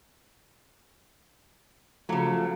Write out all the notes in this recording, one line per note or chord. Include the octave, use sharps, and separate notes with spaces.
C#3 F3 F#3 A3